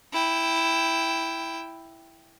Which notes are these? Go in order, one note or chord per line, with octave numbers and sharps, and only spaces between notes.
E4 G5